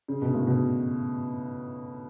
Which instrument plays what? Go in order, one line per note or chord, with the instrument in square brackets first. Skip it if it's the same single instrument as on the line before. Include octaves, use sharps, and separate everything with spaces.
[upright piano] C#3
B2
A2
B2